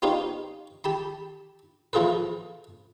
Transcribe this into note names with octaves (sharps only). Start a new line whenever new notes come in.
B3 C#4 D#4 F4 G4 C5
G4 A5 B5
E3 F3 F4 G#4 A4 B4